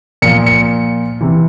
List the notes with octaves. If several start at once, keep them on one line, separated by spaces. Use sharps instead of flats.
A#2 F3 C#7
C#7
C3 E3